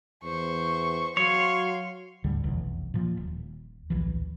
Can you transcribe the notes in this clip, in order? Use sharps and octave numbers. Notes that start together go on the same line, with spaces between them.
E2 C5 C#6
F#3 C#5 F5 C6
G#1 D2 D3 G3
F1 B1 E2
A#2 F3
D#1
D1 A#1 E3